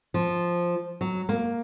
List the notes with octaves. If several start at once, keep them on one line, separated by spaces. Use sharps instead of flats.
F3
F#3
A#3